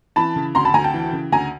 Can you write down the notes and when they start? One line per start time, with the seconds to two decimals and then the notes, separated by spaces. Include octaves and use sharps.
0.16 E3 A5 B5
0.36 C#3
0.55 D2 A#5 C6
0.65 A5 B5
0.74 D2 G#5 A#5
0.84 G5 A5
0.94 E3
1.13 C#3
1.32 D2 G#5 A#5